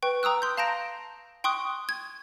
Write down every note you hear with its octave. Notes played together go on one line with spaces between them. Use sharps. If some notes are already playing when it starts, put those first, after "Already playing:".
B4 G5 C#6
G5 A#5 D#6 E6 F#6
C6 G6
F5 A5 A#5 G6 A#6 D7
G5 C6 C#6 D#6 F#6
G#6